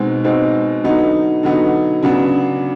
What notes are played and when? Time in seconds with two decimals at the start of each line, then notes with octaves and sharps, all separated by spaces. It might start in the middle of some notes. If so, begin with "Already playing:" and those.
Already playing: B2 G#3 C4 D#4
0.24 B2 G#3 C4 D#4
0.84 D3 F#3 B3 D#4
1.43 D3 F#3 B3 D#4
2.03 C#3 F#3 B3 D4